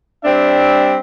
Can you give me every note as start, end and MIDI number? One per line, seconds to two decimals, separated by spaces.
0.25 0.97 55
0.25 0.97 60
0.25 0.97 62
0.25 0.97 76